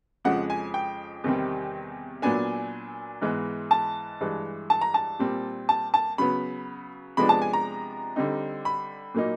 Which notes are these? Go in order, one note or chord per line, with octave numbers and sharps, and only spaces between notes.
F2 C#3 F3 G#3 F#5
G#5
G5
E2 C3 D#3 G3 C4
A#2 F#3 B3 D4 G#5
G#2 E3 G#3 B3
A5
G2 E3 G#3
A5
A#5
A5
A#2 G3 C4
A5
A5
C#3 F#3 B3 B5
C3 F3 G#3 B3 D4 B5
A5
G#5
A#5
D3 G3 C4 D#4
B5
A#2 F#3 A#3 D#4